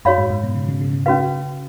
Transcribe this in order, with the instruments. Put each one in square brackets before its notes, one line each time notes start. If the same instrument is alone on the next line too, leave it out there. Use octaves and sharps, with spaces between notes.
[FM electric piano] F#2 [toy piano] F#4 C#5 F5 B5
[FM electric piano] G#2
G#2
B2
C#3
C#3
C#3
C#3
[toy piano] C#4 F#4 B4 F5